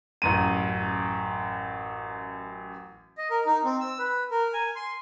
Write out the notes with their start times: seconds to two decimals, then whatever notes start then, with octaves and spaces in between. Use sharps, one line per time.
0.22 A1 F#2 D#7
3.18 D#5
3.31 A#4
3.47 D#4
3.64 C4
3.80 E6
3.99 B4
4.31 A#4
4.54 G#5
4.76 C6